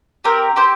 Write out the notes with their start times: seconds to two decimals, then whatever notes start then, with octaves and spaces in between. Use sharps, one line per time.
0.24 C4 G4 A#4
0.56 C4 G4 C5